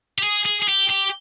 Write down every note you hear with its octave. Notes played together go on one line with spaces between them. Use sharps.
G4
G#4
G#4
G#4
G4
G4